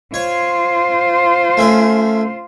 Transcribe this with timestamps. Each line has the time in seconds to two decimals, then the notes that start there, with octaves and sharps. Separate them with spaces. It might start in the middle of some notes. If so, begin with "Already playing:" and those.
0.14 F4 C5 C#5
1.57 A3 C#4 A#4